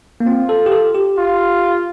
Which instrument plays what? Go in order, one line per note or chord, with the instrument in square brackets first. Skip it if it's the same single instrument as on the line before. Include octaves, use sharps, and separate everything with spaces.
[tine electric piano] A#3
[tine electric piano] C4 [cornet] F4
[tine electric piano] A4
G4
A4
G4
[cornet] F4